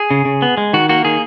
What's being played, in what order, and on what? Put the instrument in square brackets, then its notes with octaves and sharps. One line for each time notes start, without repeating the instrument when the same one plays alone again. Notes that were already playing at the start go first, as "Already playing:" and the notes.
Already playing: [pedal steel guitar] G#4
C#3
C#3
B3
G#3
D#3 F#4
A#3 F#4
D#3 G#4